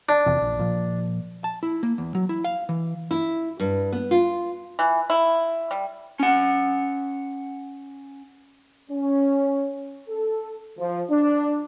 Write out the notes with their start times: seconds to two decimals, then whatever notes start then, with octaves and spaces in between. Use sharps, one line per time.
0.09 D4
0.26 F1 E2 C3
0.42 A#1
0.59 A#2 F3
1.44 A5
1.63 E4
1.83 A#3
1.98 E2
2.15 F#3
2.29 E4
2.44 F5
2.69 E3
3.11 E4
3.60 G2
3.93 B3
4.11 F4
4.79 E3
5.10 E4
5.71 G3
6.19 C#4 F#5
8.90 C#4
10.09 A4
10.78 F3
11.10 D4